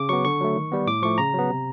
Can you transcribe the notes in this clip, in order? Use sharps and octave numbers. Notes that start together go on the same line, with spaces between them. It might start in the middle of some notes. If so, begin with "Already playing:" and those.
Already playing: C#3 D6
F#3 B3 C#6
D3 C#6
F#3 A3
D#3
G3 B3
A2 D6
F3 A3 C#6
C#3 A#5
F#3 B3
C3